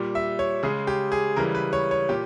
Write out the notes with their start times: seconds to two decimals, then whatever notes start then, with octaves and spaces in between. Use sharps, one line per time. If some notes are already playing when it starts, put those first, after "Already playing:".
Already playing: A#2 G3
0.15 E5
0.39 C#5
0.63 C#3 G#3 G#4
0.87 G4
1.12 G#4
1.36 C#3 E3 G3 A#4
1.55 B4
1.73 C#5
1.91 C#5
2.09 A#2 G4